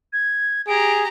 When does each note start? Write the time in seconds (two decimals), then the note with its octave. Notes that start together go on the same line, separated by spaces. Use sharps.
0.13 G#6
0.68 G4 G#4 A#5 D7